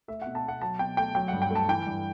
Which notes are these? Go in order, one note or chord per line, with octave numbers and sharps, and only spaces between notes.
A3 E5
B2 F#5
A5
B2 F#5
F#3 A5
B2 G5
A3 G5
F#3 G5
G2 F#5
G5
A3 A5
E3 G5
G2